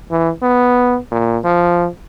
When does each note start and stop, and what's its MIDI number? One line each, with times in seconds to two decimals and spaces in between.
0.11 0.31 52
0.42 0.98 59
1.12 1.38 46
1.44 1.87 53